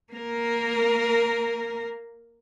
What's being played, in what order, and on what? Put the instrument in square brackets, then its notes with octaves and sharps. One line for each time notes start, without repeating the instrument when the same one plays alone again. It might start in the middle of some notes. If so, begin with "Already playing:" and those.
[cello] A#3 A#4